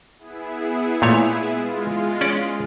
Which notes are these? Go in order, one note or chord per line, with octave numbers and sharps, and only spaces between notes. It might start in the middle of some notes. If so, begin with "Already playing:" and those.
B3 E4 G#4
A#2 A3 C#5
G#3 F4
C#4 D5 F#5